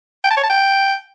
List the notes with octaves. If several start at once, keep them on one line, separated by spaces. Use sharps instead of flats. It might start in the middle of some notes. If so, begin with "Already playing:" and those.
G5
A5
C#5
A5
G5